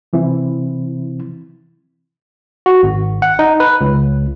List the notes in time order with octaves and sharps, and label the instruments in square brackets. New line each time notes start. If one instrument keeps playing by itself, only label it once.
[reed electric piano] C3 E3 C4 E4
[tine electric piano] F#4
G#1
F#5
D#4
B4
C#2